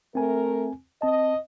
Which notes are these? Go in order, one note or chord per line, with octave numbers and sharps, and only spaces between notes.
A3 C4 A#4 G#5
C4 D#5 A5